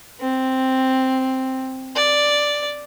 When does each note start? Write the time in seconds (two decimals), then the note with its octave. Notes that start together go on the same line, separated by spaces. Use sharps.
0.20 C4
1.96 D5